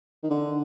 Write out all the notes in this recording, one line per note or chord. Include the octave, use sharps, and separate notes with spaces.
D#3
D3